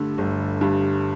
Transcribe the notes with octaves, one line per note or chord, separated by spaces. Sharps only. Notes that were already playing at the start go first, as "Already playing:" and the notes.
Already playing: G2 D3 A3
G1
G2